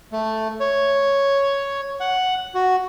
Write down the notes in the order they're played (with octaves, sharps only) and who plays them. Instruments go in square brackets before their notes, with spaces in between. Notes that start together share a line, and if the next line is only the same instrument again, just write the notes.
[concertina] A3
C#5
F#5
F#4